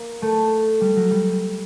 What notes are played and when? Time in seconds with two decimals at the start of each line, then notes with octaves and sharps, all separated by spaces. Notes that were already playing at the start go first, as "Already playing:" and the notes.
Already playing: A#3
0.22 A3
0.81 G3
0.96 F#3
1.11 G3